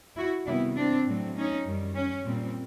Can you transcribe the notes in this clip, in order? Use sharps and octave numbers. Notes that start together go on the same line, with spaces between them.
E4 F#4
C3 D#3 G3 B3 D4 E4
C4 D4
A2 F#3 A3 C4
C#4 D#4
F#2 D#3 G3
C#4
A#2 G3 C4